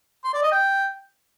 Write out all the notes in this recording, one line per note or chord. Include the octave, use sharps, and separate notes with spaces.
C6
D5
D#5
G5